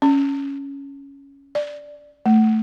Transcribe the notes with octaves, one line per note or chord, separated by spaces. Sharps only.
C#4
D5
A3